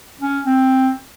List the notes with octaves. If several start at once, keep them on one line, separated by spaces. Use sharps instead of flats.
C#4
C4